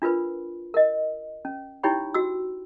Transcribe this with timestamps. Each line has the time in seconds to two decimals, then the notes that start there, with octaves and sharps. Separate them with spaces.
0.02 D4 F4 A#4 B4 B5
0.74 A#4 D#5
1.45 C#4
1.83 D#4 E4 G4 C#5 G5 B5
2.14 F#4 E6